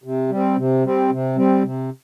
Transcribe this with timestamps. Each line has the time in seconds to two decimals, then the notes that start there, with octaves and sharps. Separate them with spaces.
0.04 C3
0.29 G3 C4
0.57 C3
0.84 G3 C4
1.10 C3
1.36 G3 C4
1.63 C3